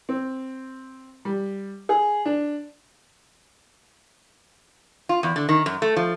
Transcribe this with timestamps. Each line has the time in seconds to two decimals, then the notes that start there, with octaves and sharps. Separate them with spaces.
0.09 C4
1.25 G3
1.89 G#4
2.26 D4
5.09 F4
5.23 E2
5.36 D3
5.49 D#3
5.66 F#2
5.82 A3
5.96 F3